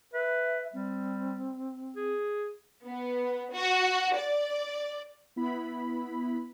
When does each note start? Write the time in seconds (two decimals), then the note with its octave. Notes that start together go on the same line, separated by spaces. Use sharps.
0.13 B4 E5
0.74 G3 C4
1.96 G#4
2.84 B3
3.51 F#4
4.16 D5
5.36 B3 E4 B5